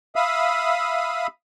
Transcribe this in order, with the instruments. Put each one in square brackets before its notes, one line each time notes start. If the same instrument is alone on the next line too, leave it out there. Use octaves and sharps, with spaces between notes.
[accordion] E5 F5 B5 D#6